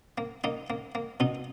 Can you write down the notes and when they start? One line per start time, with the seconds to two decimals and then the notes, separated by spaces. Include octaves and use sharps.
0.18 A#3
0.44 A#3 D#4
0.70 A#3
0.95 A#3
1.20 B2 D#4